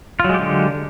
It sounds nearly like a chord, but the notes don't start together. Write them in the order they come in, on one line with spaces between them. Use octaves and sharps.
F4 F#3 G#3 G4 D3